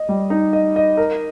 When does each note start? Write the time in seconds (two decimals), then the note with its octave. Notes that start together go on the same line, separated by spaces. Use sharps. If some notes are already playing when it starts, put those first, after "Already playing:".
Already playing: D#5
0.09 G3
0.30 D#4
0.53 D#5
0.76 D#5
0.97 A#4